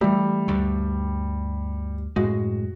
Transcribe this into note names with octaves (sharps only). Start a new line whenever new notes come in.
E3 G3 A3
D2 G2
F#2 A2 G#3 F#4